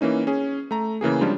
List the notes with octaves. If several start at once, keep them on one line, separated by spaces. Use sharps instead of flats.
E3 A#3 C#4 D#4
C#4 G#4
A3 A#5
C#3 E3 A#3 G#4
F3 G3 G#3 C#4 D4 F4